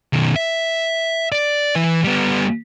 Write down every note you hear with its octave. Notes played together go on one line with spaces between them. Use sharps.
B2 D#3
E5
D5
E3 B4
G3 B3